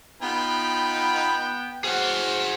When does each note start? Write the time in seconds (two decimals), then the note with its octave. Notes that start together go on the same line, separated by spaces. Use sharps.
0.22 B3 D#4 F4 G5 B5
1.84 F#4 G#4 C5 F#5 F6